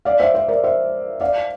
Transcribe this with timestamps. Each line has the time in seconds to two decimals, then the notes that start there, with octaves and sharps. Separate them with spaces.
0.05 D5 F5
0.20 C5 E5
0.34 C5 E5
0.48 A#4 D5
0.64 C5 E5
1.21 D5 F5